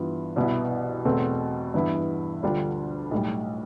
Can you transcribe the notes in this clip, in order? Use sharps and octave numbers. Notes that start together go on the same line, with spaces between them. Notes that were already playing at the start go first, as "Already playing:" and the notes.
Already playing: G2 E3 B3 F4
C2 B2 B3 E4
E2 B2 A3 C4
G2 E3 B3 E4
D2 D3 G3 D4 F4
B1 A2 G3